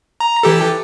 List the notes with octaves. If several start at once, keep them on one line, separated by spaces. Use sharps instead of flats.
A#5
E3 G4 A4